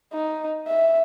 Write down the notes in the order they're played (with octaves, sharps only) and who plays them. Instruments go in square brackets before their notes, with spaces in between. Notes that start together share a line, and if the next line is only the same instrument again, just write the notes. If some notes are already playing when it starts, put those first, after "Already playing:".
[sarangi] D#4
E5